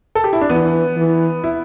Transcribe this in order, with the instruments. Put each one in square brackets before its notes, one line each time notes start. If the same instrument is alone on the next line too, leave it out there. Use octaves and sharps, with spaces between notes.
[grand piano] A4
G4
E4
D4
[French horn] E3 [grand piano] B3
[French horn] E3
[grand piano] E4